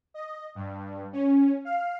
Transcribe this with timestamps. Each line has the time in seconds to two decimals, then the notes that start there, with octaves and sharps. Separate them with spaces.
0.14 D#5
0.55 G2
1.13 C#4
1.65 F5